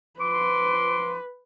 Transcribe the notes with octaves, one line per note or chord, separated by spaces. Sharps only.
F3 B4 C6 D6